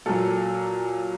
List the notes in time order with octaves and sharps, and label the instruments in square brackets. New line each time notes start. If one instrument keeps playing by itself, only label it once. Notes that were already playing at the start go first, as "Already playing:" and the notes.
[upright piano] A#2 F#3 A4